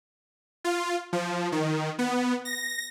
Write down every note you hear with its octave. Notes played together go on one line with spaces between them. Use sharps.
F4
F3
D#3
B3
A#6